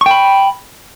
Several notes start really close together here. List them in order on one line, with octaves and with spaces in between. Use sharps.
C#6 G5 B5